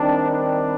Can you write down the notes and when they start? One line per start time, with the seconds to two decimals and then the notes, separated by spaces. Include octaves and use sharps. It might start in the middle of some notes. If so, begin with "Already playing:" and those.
Already playing: D#3 G3 C4 D4
0.31 D4